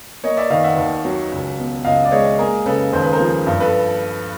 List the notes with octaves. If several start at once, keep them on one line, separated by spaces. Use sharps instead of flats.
A#3 C#5 D#5
D5 E5
D#3 D#5 F5
E5 F#5
D#2
F#3
C#2
B2
C#2 D#5 F5
D5
G#3 C#5 D#5
A#3 G#4 A#4
C#3 A4 B4
D#2 C5
B4
A#4 C5
F3
G2
A4 B4